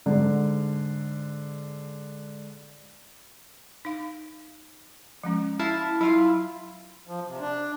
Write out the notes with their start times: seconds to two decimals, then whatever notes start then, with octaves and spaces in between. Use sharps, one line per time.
0.06 G#2 D3
3.85 D#4 F5
5.24 F3 G#3 C#4
5.59 E4 F5 A5
6.01 F#3 E4 F4 F5
7.07 F3
7.28 C3
7.40 D4